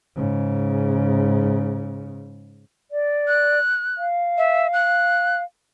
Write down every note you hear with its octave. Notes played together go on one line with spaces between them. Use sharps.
G#2 C#3
D5
F#6
F5
E5
F#6